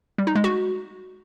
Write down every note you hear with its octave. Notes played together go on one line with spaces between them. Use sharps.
G3
D#4
G#3
F#4